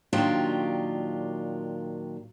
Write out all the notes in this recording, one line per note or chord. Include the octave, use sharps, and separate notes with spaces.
A#2 D#3 F#3 D4 F4 G4